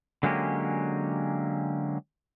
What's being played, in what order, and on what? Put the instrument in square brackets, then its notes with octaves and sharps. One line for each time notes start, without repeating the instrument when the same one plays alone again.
[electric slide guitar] D3 F#3 G#3 A#3 C#4 G4